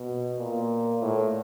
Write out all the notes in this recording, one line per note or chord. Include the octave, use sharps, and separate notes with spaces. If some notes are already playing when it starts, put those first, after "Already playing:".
Already playing: B2
A#2
A2